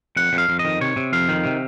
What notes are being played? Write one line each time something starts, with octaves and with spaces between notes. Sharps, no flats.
F2 F#5
F2
F5
F2
D#5
D#3
C3 C#5
C3
F2 F5
D#3
C3